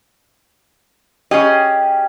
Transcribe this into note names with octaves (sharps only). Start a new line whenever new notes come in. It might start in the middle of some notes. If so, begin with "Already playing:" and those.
C#4 G4 G#4 D#5